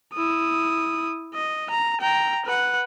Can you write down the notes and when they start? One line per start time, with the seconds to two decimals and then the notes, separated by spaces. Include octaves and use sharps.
0.14 E4 D#6
1.34 D#5
1.70 A#5
2.01 G5 A#5
2.46 B4 F#5